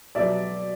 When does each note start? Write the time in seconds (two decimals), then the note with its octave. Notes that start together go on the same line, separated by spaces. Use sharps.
0.15 B2 F#3 D5 E5